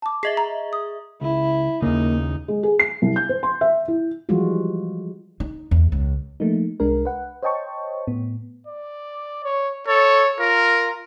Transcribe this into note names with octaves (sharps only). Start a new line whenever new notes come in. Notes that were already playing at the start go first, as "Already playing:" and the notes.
A5 D6
G#4 D#5 E5 C7
A#5
D#6
C#2 E4
D#2 C#3 A#3 D#4
G#3
G#4
C7
C2
G6
C5
C6
E5
E4
E3 F3 G3 G#3 F4 F#4
D#4
E2
C#2
F3 A3 A#3 D#4
C2 G#3 D4 A#4
B4 F#5
C5 C#5 D#5 G5 A5 C#6
A2 B3
D5
C#5
A4 C#5
F4 A#4